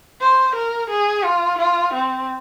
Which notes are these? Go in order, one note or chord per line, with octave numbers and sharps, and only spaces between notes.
C5
A#4
G#4
F4
F4
C4